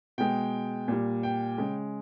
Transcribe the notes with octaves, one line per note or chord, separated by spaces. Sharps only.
B2 G#3 G5
A#2 G3
G5
C#3 G#3